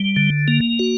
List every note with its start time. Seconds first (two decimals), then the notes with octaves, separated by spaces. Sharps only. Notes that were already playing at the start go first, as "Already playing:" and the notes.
Already playing: G3
0.16 D3
0.48 A#3
0.79 F#4